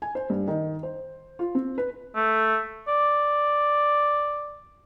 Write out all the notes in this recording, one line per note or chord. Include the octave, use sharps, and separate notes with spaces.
G#5
C5
G2
D#3
C5
F4
C4
B4
A3
D5